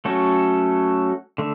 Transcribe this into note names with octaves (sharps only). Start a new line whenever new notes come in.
F#3 A3 C#4 F#4 A4
D3 A3